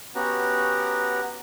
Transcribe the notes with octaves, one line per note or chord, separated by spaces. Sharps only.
B3 C#4 F#4 G4 F#5 A#5